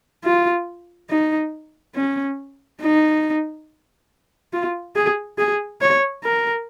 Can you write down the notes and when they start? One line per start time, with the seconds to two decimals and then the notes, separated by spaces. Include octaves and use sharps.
0.24 F4
1.10 D#4
1.95 C#4
2.81 D#4
4.53 F4
4.96 G#4
5.38 G#4
5.81 C#5
6.24 A#4